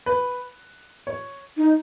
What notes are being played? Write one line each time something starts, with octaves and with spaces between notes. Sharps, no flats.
B4
C#5
D#4